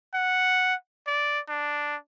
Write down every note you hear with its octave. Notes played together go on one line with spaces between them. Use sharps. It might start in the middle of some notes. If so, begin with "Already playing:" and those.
F#5
D5
D4